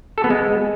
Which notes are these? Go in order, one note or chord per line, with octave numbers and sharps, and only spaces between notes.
A4
B3
G#3